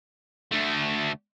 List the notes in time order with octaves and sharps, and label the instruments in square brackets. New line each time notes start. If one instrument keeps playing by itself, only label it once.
[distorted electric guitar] D2 A3